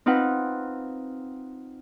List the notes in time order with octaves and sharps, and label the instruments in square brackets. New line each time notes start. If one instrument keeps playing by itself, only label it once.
[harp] C4 D#4 F4 B4 F#5